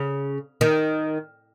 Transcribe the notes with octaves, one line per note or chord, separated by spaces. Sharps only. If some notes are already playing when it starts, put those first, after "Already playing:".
Already playing: C#3
D#3